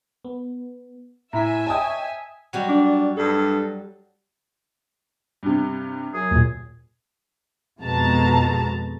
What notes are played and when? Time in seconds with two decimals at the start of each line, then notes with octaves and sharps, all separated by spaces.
0.25 B3
1.33 A2 E5 G#5 A#5 B6
1.67 C#5 D#5 G5 A5 D#6
2.53 F#3 G3 F#4
2.69 D4
3.17 G2 A4
5.43 G2 C3
6.13 F#2 F#3 G#4
6.31 D#2 A#2
7.80 F2 B2 G#3 A5 A#5